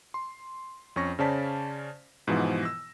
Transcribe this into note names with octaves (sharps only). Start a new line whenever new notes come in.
C6
F2 C#4 C#6 A#6
C#3 C#4 C5 D5 A5 B6
G#2 B2 E3 F3 B3
E6 A#6